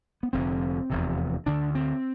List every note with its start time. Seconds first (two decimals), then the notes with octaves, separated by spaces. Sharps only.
0.23 B3
0.33 F1 F2 D3 C4
0.90 F1 E2 C3
1.46 D2 D3 D4
1.75 C4